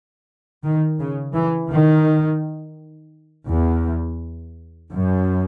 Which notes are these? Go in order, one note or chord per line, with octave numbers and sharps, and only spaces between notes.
D#3
C#3
E3
D#3
E2
F#2